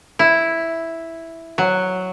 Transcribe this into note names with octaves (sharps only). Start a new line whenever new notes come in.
E4
F#3